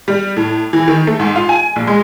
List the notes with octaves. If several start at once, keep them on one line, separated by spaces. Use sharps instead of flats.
G3
A2
E3
D#3
A3
G#2
F4
G#5
A#1
G#3